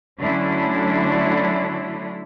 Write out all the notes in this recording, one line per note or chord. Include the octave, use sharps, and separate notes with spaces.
D3 F#3 A3 C#4 D4 E4